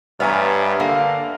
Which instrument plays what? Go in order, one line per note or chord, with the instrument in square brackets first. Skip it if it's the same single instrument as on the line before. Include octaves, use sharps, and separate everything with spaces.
[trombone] G2 [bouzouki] B3 B4 C#5 [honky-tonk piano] E5 G#5 A#5 [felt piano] F6
[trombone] D3 [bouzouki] A#3 [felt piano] F5